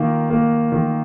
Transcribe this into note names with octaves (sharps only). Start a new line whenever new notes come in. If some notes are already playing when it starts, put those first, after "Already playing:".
Already playing: D#3 A#3 F4
A#3
D#3